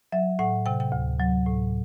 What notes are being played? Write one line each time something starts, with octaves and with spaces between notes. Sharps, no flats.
F#3 E5
A2 F#5
C3 G5
G5
D2
F#3
A2